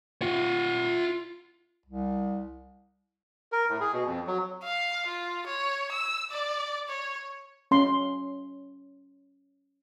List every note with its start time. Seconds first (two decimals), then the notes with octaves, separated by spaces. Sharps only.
0.22 F4 F#5
1.86 C2
3.52 A#4
3.69 A2
3.81 G#4
3.93 B2
4.07 F2
4.27 F#3
4.64 F5
5.07 F4
5.47 C#5
5.92 E6
6.31 D5
6.89 C#5
7.71 C#4 C6